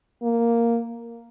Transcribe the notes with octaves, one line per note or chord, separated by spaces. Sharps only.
A#3